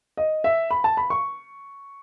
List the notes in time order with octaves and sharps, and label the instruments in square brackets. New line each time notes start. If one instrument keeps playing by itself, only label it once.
[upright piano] D#5
E5
B5
A5
B5
C#6